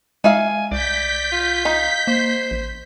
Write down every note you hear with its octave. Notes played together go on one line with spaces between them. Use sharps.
G#3 D#4 E5 F5 G#5
C2 D5 G6 B6
F4
D#4 F5
A#3 C5
A1